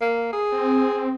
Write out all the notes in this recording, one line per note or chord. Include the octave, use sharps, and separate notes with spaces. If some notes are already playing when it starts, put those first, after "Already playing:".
A#3
G#4
C4